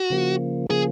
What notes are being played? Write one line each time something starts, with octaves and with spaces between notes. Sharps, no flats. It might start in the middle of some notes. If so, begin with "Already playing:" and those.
Already playing: F#4
C#3 F3 A#3
C#3 F3 A#3 G#4